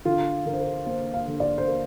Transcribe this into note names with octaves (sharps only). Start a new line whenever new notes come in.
D3 F4
D3 A#4
C5
A#4
A#3 C5
F5
D3
D5
C5
A#3 A#4